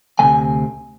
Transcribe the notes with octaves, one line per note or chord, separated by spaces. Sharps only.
D2 C3 E3 A3 G#5